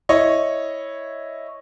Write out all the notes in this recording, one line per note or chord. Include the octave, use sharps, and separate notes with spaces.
E4 C#5 D#5